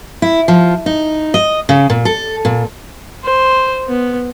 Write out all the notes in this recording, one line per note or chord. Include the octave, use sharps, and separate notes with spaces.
E4
F3
D#4
D#5
C#3
A#2
A4
A#2
C5
B3